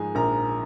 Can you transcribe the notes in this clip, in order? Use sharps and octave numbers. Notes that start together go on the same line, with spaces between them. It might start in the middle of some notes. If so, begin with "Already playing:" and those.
Already playing: G#2 F3 G#3 G#4 G#5
A#1 A#4 A#5